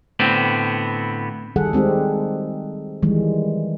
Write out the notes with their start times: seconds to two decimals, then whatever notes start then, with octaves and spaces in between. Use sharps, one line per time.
0.20 A2 D3 B3 C4
1.56 D#3 G3 G#4 A4 F#5
1.73 G#3 C4 D#4 G4
3.03 D#3 E3 G3 G#3